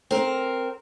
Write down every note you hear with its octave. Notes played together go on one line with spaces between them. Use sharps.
C4 A#4